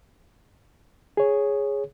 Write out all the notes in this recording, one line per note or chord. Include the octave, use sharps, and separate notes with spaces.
G#4 C#5